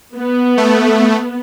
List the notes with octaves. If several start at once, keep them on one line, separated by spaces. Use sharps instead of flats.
B3
A3